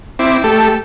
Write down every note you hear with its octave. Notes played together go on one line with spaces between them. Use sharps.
C4 E4 D6
A3 G4 A4